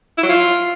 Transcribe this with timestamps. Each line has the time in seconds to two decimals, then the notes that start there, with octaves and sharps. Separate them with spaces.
0.18 E4
0.23 F#3
0.29 F4